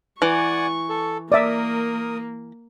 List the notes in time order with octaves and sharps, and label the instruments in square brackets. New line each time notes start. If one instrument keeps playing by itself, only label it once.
[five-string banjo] E3 [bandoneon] D5 F#5 G#5 [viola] C#6
[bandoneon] A4
[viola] A#3 [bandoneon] A#4 D#6 [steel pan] D5 E5